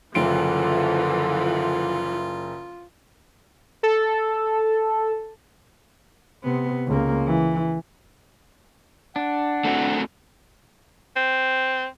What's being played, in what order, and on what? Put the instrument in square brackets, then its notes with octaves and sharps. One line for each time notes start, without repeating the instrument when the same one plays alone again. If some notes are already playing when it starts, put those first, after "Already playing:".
[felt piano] F#1 D7 [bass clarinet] D3 [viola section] E3 F3 [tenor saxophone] F4
[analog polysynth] A4
[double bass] C3 B3
C#2 A#3
E3
[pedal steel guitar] D4 [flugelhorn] F#5
[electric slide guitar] A3 C4 F#4
[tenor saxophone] C4